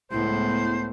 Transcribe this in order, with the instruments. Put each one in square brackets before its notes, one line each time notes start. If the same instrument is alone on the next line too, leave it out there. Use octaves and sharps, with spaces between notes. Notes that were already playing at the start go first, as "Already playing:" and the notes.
[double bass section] C#2 G#3 B3 [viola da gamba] A2 [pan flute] E4 [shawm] C5